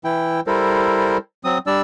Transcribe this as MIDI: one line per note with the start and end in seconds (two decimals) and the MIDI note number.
0.04 0.40 52
0.04 0.40 64
0.04 0.40 79
0.47 1.17 55
0.47 1.17 64
0.47 1.17 69
0.47 1.17 70
0.47 1.17 72
1.44 1.58 54
1.44 1.58 60
1.44 1.58 87
1.67 1.82 55
1.67 1.82 62
1.67 1.82 74
1.67 1.82 88